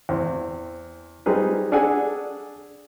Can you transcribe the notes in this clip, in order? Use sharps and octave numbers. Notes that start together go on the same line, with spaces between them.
E2 C4
G3 C4 D#4 G#4 B4
D4 G#4 A4 F#5 G#5